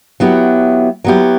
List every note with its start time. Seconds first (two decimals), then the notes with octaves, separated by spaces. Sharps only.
0.20 F#3 B3 E4 G4
1.04 F#3 B3 E4 G4